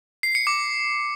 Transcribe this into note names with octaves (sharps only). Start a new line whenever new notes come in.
C7
C#7
D6